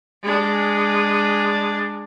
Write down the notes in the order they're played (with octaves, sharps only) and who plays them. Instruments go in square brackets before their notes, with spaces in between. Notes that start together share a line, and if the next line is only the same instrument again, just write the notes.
[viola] G#3 D4